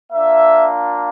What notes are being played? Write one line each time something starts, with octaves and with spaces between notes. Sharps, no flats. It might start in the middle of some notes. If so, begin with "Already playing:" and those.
A#3 D4 F4 E5